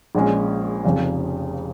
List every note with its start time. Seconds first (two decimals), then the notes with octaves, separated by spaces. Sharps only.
0.15 A#1 A#2 F3 G#3 C#4
0.84 F1 F2 C#3